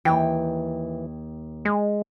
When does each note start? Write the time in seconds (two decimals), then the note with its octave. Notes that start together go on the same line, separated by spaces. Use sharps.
0.05 D#2 E3 G5
1.65 G#3